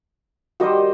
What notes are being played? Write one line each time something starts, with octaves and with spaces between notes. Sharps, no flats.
D#3 G3 F#4 G4 C5 D#5